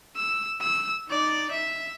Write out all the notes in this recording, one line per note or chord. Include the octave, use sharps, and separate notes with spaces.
E6
E6
D#4 D5
E5